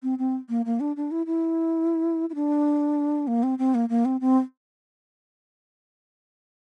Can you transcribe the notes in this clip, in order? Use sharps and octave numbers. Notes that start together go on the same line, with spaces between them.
C4
C4
A#3
A#3
D4
D4
E4
E4
E4
D4
A#3
C4
C4
A#3
A#3
C4
C4